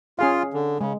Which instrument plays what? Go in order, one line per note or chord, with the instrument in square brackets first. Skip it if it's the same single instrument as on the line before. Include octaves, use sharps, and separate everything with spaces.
[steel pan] C#4 G#4 F5 [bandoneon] F4
[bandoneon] D3
[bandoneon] C#3 [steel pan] G#3